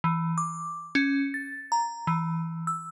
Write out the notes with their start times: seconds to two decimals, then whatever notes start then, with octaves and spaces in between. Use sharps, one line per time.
0.04 E3
0.38 D6
0.95 C#4
1.34 A6
1.72 A#5
2.07 E3
2.67 E6